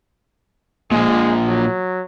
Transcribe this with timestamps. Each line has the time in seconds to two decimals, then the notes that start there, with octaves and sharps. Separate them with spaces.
0.91 A#2 F3 G#3
1.48 F#3